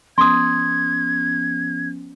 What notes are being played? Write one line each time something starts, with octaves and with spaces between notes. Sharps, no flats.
F3 B3 C#4 C6 D#6 G#6